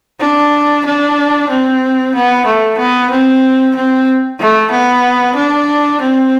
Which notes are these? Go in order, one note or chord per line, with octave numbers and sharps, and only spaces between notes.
D4
D4
C4
B3
A3
B3
C4
C4
A3
B3
D4
C4